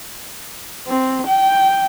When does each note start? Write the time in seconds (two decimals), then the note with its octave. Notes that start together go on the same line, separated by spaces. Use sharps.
0.87 C4
1.27 G5